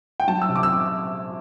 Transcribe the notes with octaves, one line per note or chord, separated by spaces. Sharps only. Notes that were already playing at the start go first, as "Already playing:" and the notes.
G5
F#3 A5
E6
C3
D6
E6